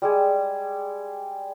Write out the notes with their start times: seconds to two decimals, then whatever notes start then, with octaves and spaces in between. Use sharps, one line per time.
0.02 G3 G#3 G#4